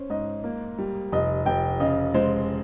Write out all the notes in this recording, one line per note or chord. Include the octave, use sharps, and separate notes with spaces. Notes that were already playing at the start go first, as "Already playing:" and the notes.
Already playing: C#4 C5
G#2 D#5
A#3
G3
F1 D#5
F1 G5
C#3 D#5
G#3 C5